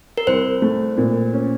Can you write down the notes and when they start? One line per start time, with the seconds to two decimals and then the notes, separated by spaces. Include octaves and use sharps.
0.18 A#4
0.27 C2 C5
0.62 A3
0.98 A#2
1.33 C#4